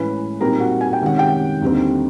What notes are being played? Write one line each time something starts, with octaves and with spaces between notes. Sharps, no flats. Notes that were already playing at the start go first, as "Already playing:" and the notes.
Already playing: A2 E3 G#3 C#4 B4 B5
A#2 G3 C4 D#4 A#4 A#5
F#4 F#5
G#5
G5
C3 D#3 G#3 C#4 F#5
G4 G5
D#2 D3 G3 C4 D#4